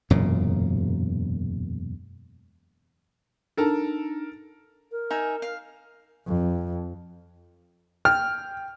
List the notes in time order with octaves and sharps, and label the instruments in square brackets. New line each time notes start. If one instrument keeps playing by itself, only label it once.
[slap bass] E1 F#2 A#2 C#3
[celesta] D4 D#4 [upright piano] A4 A#4 A5
[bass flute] A#4
[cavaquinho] D#4 E5 G#5
F5
[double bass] F2
[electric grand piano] G5 [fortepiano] F6